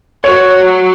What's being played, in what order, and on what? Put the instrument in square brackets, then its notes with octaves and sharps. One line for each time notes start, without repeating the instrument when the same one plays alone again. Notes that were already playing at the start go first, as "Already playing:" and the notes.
[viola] F#4 [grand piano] C#5
[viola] F#3